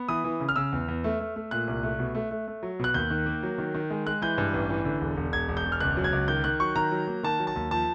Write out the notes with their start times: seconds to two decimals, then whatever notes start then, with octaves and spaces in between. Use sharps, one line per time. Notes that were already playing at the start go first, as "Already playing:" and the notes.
Already playing: B3
0.09 E3 D#6
0.24 E3
0.40 C#3
0.49 F6
0.56 C#3 E6
0.72 E2
0.88 E2
1.04 A3
1.20 A3
1.36 A3
1.51 A#2 F#6
1.67 C2
1.83 A3
1.99 B2
2.15 A3
2.31 A3
2.48 A3
2.63 F#3
2.79 B2 F#6
2.94 D#2 G6
3.10 D#3
3.26 A#3
3.43 F#3
3.58 D#3
3.74 D#3
3.90 G#3
4.06 G#3 F#6
4.22 E3 G6
4.38 G2
4.53 A1
4.70 E3
4.85 D3
5.01 E1
5.17 E1
5.33 E1 G#6
5.48 E1
5.57 G6
5.65 E1
5.72 F6
5.80 C#2 F#6
5.97 F#3
6.04 G#6
6.13 C#2
6.28 D#3 G6
6.44 D#3 F#6
6.60 F#3 C#6
6.76 D#3 A#5
6.91 F#3
7.07 A#3
7.23 D#3 A5
7.39 F#3
7.47 A5
7.56 D#2
7.71 F3 A5